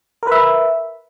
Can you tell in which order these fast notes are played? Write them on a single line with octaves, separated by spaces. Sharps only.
A#4 B4 E5